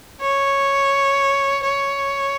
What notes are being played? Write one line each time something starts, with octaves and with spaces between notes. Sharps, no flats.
C#5
C#5